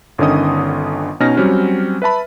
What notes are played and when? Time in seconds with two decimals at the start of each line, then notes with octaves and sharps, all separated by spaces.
0.18 G1 D3 D#3 C#4 D#5 D#6
1.20 B2 C#4 D#4 F6 A#6
1.37 F#3 G3 C4 C#4 F#4
2.02 B4 E5 A5 B5